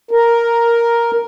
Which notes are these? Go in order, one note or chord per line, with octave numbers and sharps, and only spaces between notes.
A#4